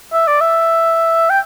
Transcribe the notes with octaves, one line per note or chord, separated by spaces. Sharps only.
E5
D5
E5
G5